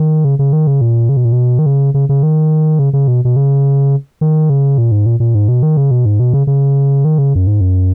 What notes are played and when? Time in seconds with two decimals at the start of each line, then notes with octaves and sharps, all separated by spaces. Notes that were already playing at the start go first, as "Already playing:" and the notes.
Already playing: D#3
0.25 C#3
0.39 C#3
0.53 D#3
0.67 C#3
0.81 A#2
1.09 C#3
1.17 B2
1.25 A#2
1.32 B2
1.59 D#3
1.66 C#3
1.94 C#3
2.09 C#3
2.23 D#3
2.79 C#3
2.93 C#3
3.08 B2
3.25 B2
3.36 C#3
4.21 D#3
4.50 C#3
4.78 A#2
4.92 G#2
5.06 A#2
5.20 A#2
5.35 G#2
5.48 B2
5.63 D#3
5.77 C#3
5.91 B2
6.06 G#2
6.20 B2
6.34 C#3
6.47 C#3
7.05 D#3
7.18 C#3
7.35 F#2
7.47 G#2
7.61 F#2